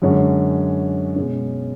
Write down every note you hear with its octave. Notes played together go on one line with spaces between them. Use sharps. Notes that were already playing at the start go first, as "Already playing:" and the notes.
F#2 D3 G#3 C#4
B2 G#3 C#4